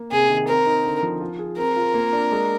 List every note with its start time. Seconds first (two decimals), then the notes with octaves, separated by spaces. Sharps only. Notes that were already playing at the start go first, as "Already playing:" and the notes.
Already playing: A#3
0.12 C3 G#4
0.29 D#3
0.48 C4 A#4
0.66 D#4
0.85 D3
1.03 F3
1.21 F4
1.39 G#4
1.57 C4 A#4
1.76 F4
1.94 A#3
2.13 D4
2.32 G#3